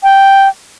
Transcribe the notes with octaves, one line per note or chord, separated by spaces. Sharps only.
G5